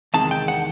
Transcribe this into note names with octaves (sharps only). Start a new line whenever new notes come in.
E2 C3 D#3 G#3 A5
G5
F#5